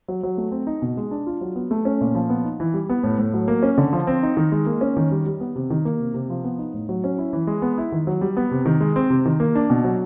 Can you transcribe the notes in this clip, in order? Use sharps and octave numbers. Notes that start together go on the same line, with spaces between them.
F#3
F#3
A3
C4
D#4
B2
G#3
D4
F4
F#3
B3
A3
C#4
A#2
F3
B3
D#4
E3
G3
B3
A2
A2
F#3
A#3
C#4
D3
F3
C4
D#4
D#3
G#3
A#3
C#4
D#3
G3
G3
B3
C3
D#3
A#3
C3
C3
F3
B3
D#4
A2
F#3
C#4
E4
E3
G#3
B3
E4
D#3
F#3
G3
B3
C3
D#3
G#3
C4
C3
D#3
A#3
D4
B2
F#3